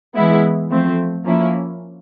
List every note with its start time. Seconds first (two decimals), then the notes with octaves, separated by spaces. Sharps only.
0.16 E3 G#3 B3 E4
0.70 F3 A3 C4
1.24 F3 A#3 C#4 E4